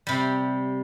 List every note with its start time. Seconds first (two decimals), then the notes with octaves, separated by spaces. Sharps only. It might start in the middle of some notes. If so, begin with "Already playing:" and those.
0.07 C3 G3